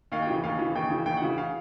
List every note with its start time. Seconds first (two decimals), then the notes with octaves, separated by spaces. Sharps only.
0.12 D#2 F5
0.22 G5
0.27 C#3 E3
0.43 D#2 F5
0.59 E3
0.64 C#3
0.75 D#2 G5
0.90 C#3 E3
1.06 D#2 G5
1.17 F#5
1.22 C#3 E3
1.38 F5